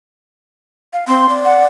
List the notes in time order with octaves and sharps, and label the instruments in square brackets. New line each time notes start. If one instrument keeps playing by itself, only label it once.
[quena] F5
[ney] C4 [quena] C6
[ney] D5
[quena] F#5